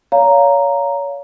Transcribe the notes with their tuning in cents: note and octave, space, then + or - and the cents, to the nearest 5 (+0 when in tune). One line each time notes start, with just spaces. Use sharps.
C#5 +30 F5 +0 A#5 +0